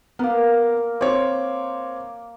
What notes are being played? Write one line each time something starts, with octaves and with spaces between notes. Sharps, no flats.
A#3 B3 A#4
C4 C#5 D6